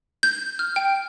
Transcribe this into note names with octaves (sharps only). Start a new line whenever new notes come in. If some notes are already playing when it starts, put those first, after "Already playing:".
G6
F6
G5